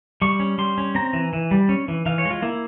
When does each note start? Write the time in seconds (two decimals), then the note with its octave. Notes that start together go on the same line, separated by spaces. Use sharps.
0.22 G3 C#6
0.40 C#4
0.58 G3 C6
0.78 C#4
0.95 C4 A#5
1.13 E3
1.33 E3
1.51 G3
1.69 C#4
1.88 E3
2.06 E3 F5
2.18 C#5
2.25 G#3
2.30 F4
2.42 A#3 E4